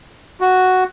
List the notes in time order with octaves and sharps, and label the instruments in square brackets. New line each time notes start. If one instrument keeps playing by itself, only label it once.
[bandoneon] F#4